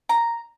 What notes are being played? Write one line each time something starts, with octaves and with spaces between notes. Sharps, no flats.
A#5